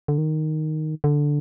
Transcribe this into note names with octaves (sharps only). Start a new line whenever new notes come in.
D3
D#3
D3